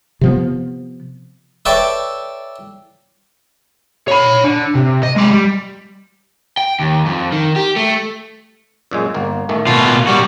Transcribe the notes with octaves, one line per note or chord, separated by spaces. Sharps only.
C3 F3 B3
A4 B4 C#5 D5 E5 G5
C#5 B5
D3
C3
D#5
G#3 D5
G3
G5
D#2
F2
D#3
G4
A3
F#2 A#2 G#3
G1 A#3
A1 D#3 A3
B2 F4
G3 F#4